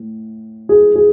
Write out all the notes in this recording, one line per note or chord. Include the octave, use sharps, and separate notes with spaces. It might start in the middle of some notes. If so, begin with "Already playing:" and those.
Already playing: A2
G#4
G#4